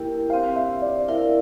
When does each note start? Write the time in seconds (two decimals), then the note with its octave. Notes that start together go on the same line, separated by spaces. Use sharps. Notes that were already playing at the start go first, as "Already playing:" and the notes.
Already playing: A#3 E4 G4 A#4 G5
0.30 C4 G4 C5 F5
0.56 E5
0.82 D5
1.08 E4 A#4 D5 E5 F5